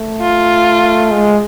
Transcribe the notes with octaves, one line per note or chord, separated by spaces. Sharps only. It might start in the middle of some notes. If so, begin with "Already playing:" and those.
Already playing: A3
F4
G#3